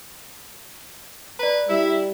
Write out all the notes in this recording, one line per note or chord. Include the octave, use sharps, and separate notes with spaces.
B4 D5 A#5
G3 E4 E5